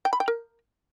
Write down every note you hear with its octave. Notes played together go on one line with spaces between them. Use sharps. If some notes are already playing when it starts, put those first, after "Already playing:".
G5
B5
G5
A#4